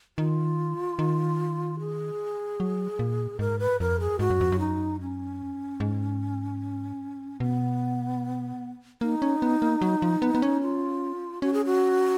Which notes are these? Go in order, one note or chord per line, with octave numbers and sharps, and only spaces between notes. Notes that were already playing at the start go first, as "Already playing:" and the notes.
D#3 F4
D#3
G#4
F#3
A#2
G#2 A#4
B4
F2 A#4
G#4
G#2 F#4
F#2
F2
F#2
D#4
C#4
G#2
B2 B3
A#3 D#4
C#4
B3
A#3
F#3
F3
B3
B3
C#4
F4
C#4 F#4
G#4
F#4